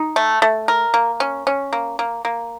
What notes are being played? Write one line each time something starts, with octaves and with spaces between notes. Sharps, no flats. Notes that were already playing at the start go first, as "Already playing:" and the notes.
Already playing: D#4
A3
A3
A#4
A#3
C#4
C#4
A#3
A#3
A#3